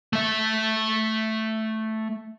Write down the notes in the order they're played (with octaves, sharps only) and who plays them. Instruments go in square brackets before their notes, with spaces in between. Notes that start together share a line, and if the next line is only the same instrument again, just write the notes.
[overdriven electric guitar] A3 E5